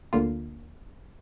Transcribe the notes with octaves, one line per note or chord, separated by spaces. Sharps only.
D2 D3 A#3 F4